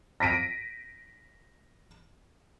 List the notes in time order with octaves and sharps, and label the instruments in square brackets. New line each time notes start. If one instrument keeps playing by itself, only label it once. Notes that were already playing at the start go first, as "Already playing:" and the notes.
[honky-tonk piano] A#6 B6 D7 D#7